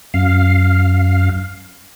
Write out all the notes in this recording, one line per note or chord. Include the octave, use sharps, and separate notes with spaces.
F#2 F5